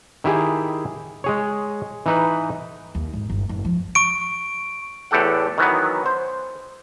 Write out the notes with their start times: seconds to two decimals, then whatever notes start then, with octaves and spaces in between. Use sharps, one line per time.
0.24 D#3 E4 G4 G#4
1.24 G#3 G#4 C#5
2.06 E3 D#4 B4
2.95 D#2
3.13 G#1
3.29 G1
3.49 F#1
3.65 F3
3.95 C#6 D7
5.11 E2 A2 G4 A4 F#5
5.58 D#3 E3 F#3 B3
6.06 C5